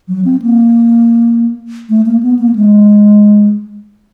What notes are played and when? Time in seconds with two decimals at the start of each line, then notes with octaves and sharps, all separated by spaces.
0.08 F#3
0.25 C4
0.42 A#3
1.90 A3
2.06 A#3
2.23 B3
2.39 A#3
2.56 G#3